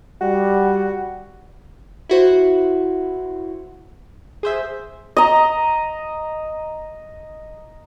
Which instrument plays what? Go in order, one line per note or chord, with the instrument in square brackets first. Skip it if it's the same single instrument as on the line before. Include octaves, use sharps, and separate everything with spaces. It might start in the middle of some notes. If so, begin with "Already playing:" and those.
[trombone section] G3 [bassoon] F#4
[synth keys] E4 F#4 C5
G#4 C5 E5
[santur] D#5 A#5